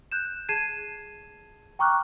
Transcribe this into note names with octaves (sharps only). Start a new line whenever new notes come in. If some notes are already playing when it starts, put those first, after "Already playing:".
F#6 G6 E7
G#4 A5 G#6 C7 D#7 E7
G5 A#5 C#6 D6 F6 F#6